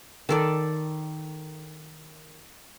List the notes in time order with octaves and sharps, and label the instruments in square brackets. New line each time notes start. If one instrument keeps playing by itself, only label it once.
[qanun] D#3 A4 D5